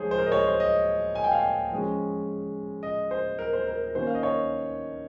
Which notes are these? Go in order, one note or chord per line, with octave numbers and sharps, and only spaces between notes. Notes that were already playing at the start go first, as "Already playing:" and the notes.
Already playing: F3 G#3 D#4 G#4 C5 C#5
C5
A#4
D#5
C#5
C5
D#5
G#5
G5
F5
G5
F3 G#3 C#4
D#5
C5
A#4
C5
A#4
A#4
D#3 A#3 C#4 C5
F5
D#5
C#5